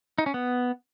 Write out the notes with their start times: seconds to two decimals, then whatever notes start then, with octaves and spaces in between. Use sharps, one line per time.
0.18 D#4
0.26 C#4
0.34 B3